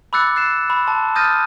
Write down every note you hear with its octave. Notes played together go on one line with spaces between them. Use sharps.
B5 D6 E6 F#6 A6 C#7
F#6 A6 C7 C#7 E7
B5
A5 C6
D#6 F6 G6 A6 A#6 D#7